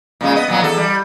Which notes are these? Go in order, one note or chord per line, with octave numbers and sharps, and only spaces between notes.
A#2 C#3 G#3
B3 D#5
A#2 F#3 B3
E2 A4
G3